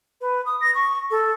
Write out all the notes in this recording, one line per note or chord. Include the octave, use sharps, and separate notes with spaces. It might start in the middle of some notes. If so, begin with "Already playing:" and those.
B4
D#6
A#6
C#6
A4